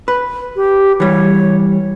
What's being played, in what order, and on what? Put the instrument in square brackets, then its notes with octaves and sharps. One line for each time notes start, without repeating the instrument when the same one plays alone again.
[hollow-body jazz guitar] B4
[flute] G4
[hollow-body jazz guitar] E3 G3 [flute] C#5